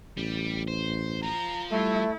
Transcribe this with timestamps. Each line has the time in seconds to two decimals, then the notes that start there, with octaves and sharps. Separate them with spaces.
0.17 A1 G3
0.68 C5
1.23 F4 C5 A#5
1.71 G3 A3 E4